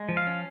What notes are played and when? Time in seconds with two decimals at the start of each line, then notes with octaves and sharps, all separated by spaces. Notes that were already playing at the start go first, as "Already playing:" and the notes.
Already playing: G#3
0.09 F3
0.17 F5
0.27 C#4